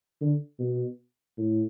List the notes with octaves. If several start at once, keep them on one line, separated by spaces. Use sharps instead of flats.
D3
B2
A2